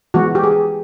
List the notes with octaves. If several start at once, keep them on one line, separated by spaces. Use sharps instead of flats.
E3 G#3 B3 F#4
G4
G#4